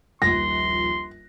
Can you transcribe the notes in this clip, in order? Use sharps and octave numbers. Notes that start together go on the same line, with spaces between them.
D#1 A#1 C6 A#6